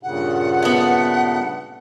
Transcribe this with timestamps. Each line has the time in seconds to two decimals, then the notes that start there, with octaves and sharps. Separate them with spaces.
0.03 G2 A#2 C#3 F#5
0.62 A3 B3